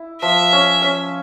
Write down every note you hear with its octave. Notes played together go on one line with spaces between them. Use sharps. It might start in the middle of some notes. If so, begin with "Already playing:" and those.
Already playing: E4
F3 E5
C#4
C#4